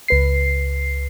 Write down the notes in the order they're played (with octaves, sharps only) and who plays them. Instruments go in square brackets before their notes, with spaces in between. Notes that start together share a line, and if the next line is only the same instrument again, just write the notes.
[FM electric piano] C#2 B4 C7